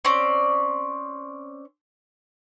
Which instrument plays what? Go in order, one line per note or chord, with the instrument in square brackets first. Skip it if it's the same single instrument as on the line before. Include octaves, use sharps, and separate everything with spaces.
[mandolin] C4 C#4 D5